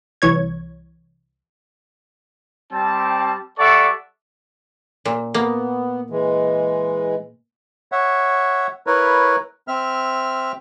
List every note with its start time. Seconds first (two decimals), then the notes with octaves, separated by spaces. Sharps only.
0.22 C2 E3 C#5 G#6
2.72 G3 C4 A5
3.59 G3 A4 D5 E5 F#5 C#6
5.05 A#2
5.34 A#3 B3
6.10 E3 G#3
7.92 C#5 E5 F#5
8.87 E4 A#4 B4 C#5
9.68 C4 E5 F6